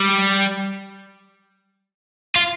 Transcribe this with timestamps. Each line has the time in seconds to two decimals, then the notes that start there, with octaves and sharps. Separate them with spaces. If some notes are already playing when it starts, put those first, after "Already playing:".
Already playing: G3
2.36 F4